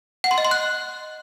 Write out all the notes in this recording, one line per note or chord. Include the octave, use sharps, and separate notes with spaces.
F#5
C6
D#5
C6
F#6